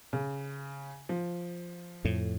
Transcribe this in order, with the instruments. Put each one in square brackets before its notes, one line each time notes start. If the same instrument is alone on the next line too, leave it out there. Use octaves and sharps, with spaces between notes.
[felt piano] C#3
F3
[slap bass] F2 A2